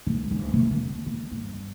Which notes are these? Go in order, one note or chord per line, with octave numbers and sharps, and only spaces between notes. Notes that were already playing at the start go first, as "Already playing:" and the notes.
C#2 D3
D1 F3
C3 C#4
D#3
B3
G2